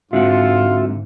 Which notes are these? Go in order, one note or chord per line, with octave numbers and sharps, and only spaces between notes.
G#2 D3 G#3 C4 F4 F#4 E5 F#5